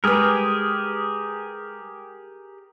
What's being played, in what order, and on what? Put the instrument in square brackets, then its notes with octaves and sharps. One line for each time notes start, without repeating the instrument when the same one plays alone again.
[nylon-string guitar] G#3 B4 [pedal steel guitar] G4 G#4 A#4